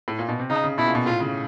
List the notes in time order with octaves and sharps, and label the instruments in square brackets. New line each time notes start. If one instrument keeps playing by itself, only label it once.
[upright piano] A2
A#2
B2
C3
[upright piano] C#3 [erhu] D#4
[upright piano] C#3
[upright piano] B2 [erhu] E4
[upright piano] A#2
B2
[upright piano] A2 [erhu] F4
[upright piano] C#3